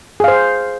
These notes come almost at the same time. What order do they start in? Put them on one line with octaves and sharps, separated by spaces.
G#4 F5 C5